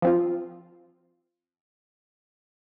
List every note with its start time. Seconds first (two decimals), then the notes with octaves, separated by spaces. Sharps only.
0.02 F3 C4 F4